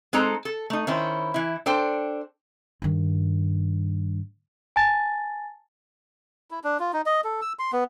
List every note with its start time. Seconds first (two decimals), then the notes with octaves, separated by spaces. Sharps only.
0.13 G#3 C4 D#4 A4 A#5
0.45 A4
0.70 A3 D#4
0.87 D#3 C#4 E4 C5
1.34 E3 E4
1.66 D4 A4 C5 G5
2.82 G2 D#3
4.76 G#5 A5 A6
6.51 E4
6.64 D4
6.80 F4
6.93 D#4
7.06 D#5
7.24 A4
7.42 E6
7.59 C6
7.73 B3